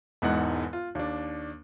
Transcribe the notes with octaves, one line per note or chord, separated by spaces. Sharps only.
E1 E2 G#2 D#4 F#5 F#6
F4
D#2 D4